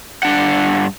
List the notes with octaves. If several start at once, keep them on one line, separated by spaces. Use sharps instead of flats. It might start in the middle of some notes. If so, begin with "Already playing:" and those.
G2 D4 F#5